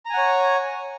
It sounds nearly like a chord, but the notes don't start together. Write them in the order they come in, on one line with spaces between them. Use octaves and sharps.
A#5 G#5 F#5 C#5